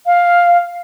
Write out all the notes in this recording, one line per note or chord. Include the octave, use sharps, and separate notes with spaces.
F5